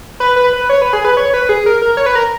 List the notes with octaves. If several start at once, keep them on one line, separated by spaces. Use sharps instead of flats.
B4
B4
B4
C#5
B4
G#4
B4
C#5
B4
G#4
A#4
A#4
C#5
B4
A#4